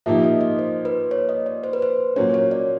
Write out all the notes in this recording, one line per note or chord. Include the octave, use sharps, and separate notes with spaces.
A#2 F3 A#3 D#4 G4 E5
D#5
D#5
C5
B4
C#5
D#5
D5
C5
B4
C5
A#2 F#3 A#3 C#4 C#5
C#5
D5